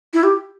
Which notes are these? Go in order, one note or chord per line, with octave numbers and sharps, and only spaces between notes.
E4
G4